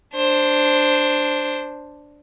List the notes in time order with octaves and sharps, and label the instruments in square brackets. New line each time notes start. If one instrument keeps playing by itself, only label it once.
[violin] D4 C5